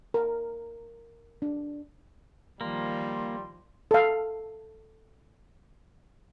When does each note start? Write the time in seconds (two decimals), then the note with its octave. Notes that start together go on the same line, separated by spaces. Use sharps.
0.14 A#4
1.42 D4
2.61 D#3 F3 G3 A#3 C6
3.91 A4 F5